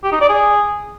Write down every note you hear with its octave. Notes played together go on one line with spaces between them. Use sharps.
G4
D#4
D5
G#4